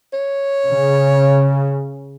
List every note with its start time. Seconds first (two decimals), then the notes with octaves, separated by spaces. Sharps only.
0.13 C#5
0.68 C#3